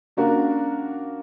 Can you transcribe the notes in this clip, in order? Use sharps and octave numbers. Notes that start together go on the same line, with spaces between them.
C#3 A#3 D4 F#4 A#4